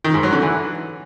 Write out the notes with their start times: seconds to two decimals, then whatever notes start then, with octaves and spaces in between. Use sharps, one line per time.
0.04 D#3
0.14 G#2
0.23 F#3
0.33 D3
0.42 E3